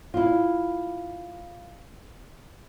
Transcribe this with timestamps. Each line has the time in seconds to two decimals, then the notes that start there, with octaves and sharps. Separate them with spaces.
0.14 E4 F4